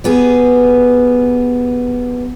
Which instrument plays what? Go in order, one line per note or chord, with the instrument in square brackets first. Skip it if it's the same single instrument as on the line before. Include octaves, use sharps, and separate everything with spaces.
[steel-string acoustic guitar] G3 B3 G#4